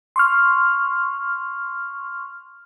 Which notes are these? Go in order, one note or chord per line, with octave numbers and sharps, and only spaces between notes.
C6 C#6 F6